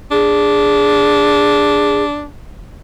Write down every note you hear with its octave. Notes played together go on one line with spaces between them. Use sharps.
D4 G#4